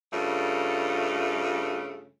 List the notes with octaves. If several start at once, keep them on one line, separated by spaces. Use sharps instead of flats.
G2 C#3 A3 F4